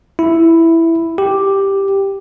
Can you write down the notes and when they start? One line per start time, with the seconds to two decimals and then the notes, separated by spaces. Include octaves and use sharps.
0.19 E4
1.18 G4